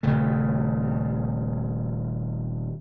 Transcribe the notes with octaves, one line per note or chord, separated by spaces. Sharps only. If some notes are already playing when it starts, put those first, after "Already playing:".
D#1 C#3 A3